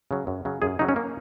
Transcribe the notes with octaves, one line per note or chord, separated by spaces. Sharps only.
C#3 F#3
F#2
C#3 F#3
F#2 G#4
C#3 F#3 D#4
C#4
A#3